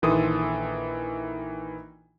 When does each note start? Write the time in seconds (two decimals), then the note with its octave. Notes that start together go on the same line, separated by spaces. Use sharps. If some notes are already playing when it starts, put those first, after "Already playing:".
0.02 A#1 D#3 E3 A4 C6 D#6